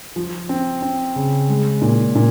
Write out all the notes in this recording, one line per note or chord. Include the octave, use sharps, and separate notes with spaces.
F3
C4
C4
C#3
G#3
A#2
A#2